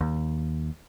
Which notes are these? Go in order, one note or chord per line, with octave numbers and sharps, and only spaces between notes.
D#2